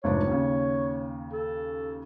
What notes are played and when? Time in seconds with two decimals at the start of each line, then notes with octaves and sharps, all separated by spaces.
0.04 F1 G#2 D4 C#5
0.27 D#2 C#3
1.33 A4